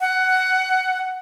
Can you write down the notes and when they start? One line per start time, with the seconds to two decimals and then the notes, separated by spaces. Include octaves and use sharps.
0.01 F#5